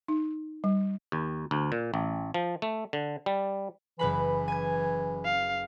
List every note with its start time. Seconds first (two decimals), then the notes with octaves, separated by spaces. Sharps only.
0.08 D#4
0.64 G3
1.12 D#2
1.51 D2
1.72 A#2
1.94 A1
2.34 F3
2.62 A3
2.93 D3
3.26 G3
3.99 F#1 E3 B4 B5
4.48 G#5 G#6
5.25 F5